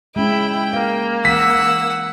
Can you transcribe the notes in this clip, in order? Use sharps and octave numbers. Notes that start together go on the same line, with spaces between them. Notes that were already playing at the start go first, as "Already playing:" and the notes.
G#3 C#4 E4 G5
A#3 F5
E3 F#5 E6 B6